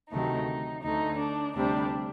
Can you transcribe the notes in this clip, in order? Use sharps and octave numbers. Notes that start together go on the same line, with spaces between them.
D2 C3 D#3 F#3 A3 D#4
D2 D3 A3 D#4
D4
D2 C3 G3 D4